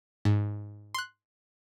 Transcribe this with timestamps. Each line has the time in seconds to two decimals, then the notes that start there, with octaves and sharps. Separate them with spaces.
0.25 G#2
0.94 C6 F#6